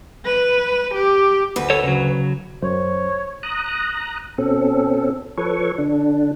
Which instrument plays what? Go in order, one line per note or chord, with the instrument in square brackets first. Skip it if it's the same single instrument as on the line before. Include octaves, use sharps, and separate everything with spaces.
[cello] B4
G4
[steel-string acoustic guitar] D2 B4
[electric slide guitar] A4 C#5
C#3 F#3
[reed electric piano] F#2 [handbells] C5 [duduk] C#5
[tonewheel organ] A#5 D#6 F#6
B2 C4 C#4 A4
F3 A4 B4 C#5 C#6
D3 D4